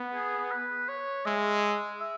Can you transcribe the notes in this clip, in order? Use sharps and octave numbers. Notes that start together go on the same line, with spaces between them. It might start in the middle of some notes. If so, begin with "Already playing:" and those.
Already playing: B3
G#4
B4
C#5
G#3 E5
E5